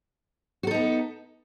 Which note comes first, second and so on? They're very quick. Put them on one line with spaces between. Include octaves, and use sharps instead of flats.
F#4 A4 D#4 B3